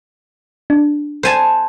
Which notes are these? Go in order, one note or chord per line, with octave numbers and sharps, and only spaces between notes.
D4
C5 G#5 A5